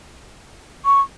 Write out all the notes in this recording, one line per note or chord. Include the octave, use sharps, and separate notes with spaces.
C#6